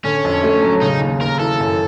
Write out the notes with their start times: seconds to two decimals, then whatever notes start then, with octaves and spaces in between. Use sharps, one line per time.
0.04 D3 C#4
0.25 F2
0.43 A3
0.63 F#3
0.82 C#3 D#4
1.01 D#2
1.20 D#2 A#4
1.39 E3 A4
1.60 F#2